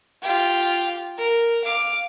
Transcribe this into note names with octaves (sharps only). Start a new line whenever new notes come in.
F4 G4
A#4
F5 D6